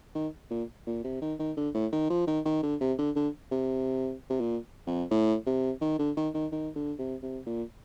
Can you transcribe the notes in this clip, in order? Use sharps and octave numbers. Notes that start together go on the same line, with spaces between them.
D#3
A#2
A#2
C3
D#3
D#3
D3
A2
D#3
F3
D#3
D#3
D3
C3
D3
D3
C3
C3
A#2
F2
A2
C3
D#3
D3
D#3
D#3
D#3
D3
C3
C3
A#2